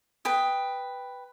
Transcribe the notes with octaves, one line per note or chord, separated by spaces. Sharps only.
B4 G5 D#6